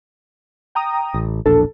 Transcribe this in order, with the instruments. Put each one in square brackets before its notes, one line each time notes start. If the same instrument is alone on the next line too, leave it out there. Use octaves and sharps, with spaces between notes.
[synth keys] G5 A#5 D#6
[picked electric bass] A1
[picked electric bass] E1 A#1 D4 [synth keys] A4